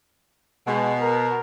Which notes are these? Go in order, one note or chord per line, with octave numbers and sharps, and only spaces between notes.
B2 G#3
A#4